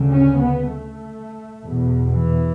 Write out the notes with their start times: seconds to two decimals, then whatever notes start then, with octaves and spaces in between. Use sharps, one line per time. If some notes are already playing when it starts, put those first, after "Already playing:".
Already playing: D2 C#3
0.10 C#4
0.40 B3
0.72 A3
1.65 E2 B2
2.12 E3